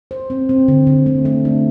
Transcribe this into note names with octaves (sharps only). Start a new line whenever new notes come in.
C5
C4
C4
D3
D3
A3
A3
D4